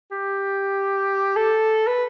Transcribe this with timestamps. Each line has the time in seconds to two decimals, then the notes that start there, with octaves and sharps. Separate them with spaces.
0.11 G4
1.36 A4
1.87 B4